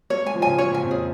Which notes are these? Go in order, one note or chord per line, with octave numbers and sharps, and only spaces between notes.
A#3 C#5
G#3
G#5
F3
C#3 G#5
C#3 C#5
A#2
G#5
F2
G#4